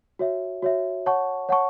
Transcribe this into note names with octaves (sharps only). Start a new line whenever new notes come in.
F#4 C#5 E5
F#4 C#5 E5
C#5 F#5 A5 C#6
C#5 F#5 A5 C#6